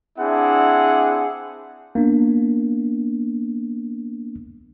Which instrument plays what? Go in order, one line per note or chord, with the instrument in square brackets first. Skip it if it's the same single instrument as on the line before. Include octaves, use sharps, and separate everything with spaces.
[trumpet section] C4 D4 E4 G#4 E5 F#5
[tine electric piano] A#3 B3 D4